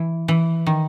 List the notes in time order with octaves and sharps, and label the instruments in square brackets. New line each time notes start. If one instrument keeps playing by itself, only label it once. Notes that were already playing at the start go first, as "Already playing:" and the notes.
Already playing: [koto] E3
E3
D#3